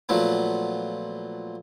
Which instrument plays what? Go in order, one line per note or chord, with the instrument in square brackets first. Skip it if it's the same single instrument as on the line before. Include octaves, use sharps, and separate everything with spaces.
[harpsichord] A#2 F3 F#3 A3 B3